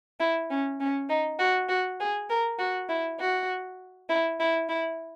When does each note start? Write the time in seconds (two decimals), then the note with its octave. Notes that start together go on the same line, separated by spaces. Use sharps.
0.20 E4
0.50 C#4
0.80 C#4
1.09 D#4
1.39 F#4
1.69 F#4
2.00 G#4
2.30 A#4
2.59 F#4
2.89 E4
3.20 F#4
4.10 E4
4.40 E4
4.69 E4